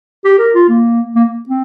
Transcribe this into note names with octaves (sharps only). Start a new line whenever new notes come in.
G4
A#4
F4
A#3
A#3
C4